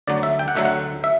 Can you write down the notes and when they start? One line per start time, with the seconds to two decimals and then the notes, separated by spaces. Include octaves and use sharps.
0.07 D2 D3 F#3 D5
0.23 E5
0.39 G5
0.48 F#5
0.55 D2 D3 F#3 E5
0.65 F#5
1.04 E5